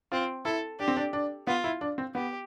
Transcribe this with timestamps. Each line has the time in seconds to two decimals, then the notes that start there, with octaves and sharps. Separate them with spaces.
0.12 C4 F4
0.45 E4 A4
0.79 D4 G4
0.88 C4
0.97 D4
1.13 D4
1.47 B3 F4
1.64 E4
1.81 D4
1.98 C4
2.15 B3 G4